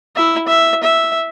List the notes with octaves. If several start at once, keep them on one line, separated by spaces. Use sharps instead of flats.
E4 E5
E5
E5